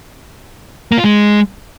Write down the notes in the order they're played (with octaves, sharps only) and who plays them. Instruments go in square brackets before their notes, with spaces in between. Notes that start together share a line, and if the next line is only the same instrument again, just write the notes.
[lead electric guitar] A#3
F4
G#3